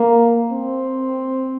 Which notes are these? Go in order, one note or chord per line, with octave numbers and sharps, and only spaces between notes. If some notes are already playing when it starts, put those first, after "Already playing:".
Already playing: A#3
C4